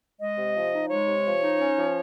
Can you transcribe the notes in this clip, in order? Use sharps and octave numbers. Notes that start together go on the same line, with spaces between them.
G#3 D#5
C3
F3
D#4
G#3 C#5
C3
F3
D#4
C#4
F3